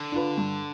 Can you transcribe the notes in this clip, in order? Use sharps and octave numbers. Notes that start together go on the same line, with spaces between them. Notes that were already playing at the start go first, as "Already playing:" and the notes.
Already playing: D3
D4 F4 B4
G2